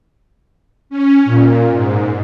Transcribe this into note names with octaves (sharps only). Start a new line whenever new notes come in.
C#4
A#2
G#2